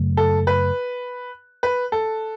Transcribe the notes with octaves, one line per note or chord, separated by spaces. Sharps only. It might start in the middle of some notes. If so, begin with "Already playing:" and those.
Already playing: F#2 C#3 F#3 A3
A4
B4
B4
A4